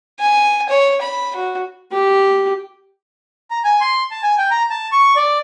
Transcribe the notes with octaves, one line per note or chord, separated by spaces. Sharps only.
G#5
C#5
B5
F#4
G4
A#5
G#5
C6
A5
G#5
G5
A#5
A5
C#6
D5